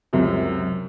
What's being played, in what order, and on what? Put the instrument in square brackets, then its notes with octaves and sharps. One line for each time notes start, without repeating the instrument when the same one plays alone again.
[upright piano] C#2 F#2 C3